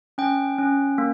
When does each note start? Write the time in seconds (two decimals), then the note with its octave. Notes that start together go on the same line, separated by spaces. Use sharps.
0.18 C#4 G5
0.59 C#4
0.98 A#3